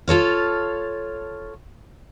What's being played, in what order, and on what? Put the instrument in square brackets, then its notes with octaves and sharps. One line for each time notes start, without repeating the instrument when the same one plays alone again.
[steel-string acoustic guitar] F4 A4 C#5 F5